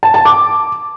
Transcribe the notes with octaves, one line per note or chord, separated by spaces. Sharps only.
A5
A5
D6